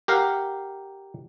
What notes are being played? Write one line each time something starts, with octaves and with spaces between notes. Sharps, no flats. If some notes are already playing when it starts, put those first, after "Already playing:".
G4 A#4 F5 F#5